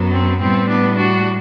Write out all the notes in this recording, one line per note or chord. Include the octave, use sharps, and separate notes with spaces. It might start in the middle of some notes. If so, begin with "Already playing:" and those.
Already playing: F#2 F#3 B3
C4
A2 G3 B3 C4
B3 D4
D4 F#4